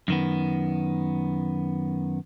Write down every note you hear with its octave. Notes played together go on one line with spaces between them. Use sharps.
F#2 D#3 B3